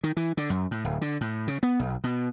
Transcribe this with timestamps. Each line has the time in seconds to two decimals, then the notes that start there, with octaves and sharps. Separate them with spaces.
0.04 D#3
0.17 E3
0.37 D3
0.50 F#2
0.71 A2
0.84 D1
1.01 D3
1.21 A2
1.48 C#3
1.63 B3
1.79 B1
2.04 B2